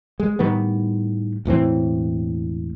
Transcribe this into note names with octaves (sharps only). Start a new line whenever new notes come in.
G#3
A2 D#3 G3 B3
E1 A2 E3 C4